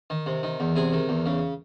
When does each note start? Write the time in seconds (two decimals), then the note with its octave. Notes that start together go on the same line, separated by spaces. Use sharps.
0.10 D#3
0.26 C3
0.43 D#3
0.60 E2
0.76 C3 G#4
0.93 D#3
1.09 E2
1.26 C#3